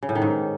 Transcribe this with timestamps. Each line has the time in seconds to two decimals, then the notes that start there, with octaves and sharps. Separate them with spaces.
0.03 C#3
0.09 A2
0.15 D#3
0.22 G#2